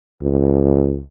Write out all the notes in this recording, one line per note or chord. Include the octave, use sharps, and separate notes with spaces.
C#2